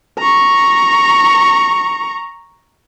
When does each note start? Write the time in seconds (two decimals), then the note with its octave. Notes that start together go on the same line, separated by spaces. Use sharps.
0.19 A#5 C#6